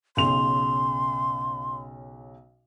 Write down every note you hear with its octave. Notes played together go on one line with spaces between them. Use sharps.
B1 C#3 C6 F7